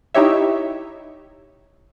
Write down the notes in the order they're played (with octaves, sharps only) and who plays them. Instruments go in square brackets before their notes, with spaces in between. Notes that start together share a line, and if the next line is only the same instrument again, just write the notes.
[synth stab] D#4 E4 G4 C#5 E5